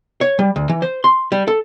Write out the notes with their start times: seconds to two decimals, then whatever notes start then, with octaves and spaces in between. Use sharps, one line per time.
0.21 C#5
0.39 G3
0.56 D2
0.69 E3
0.82 C5
1.04 C6
1.32 G3
1.48 A4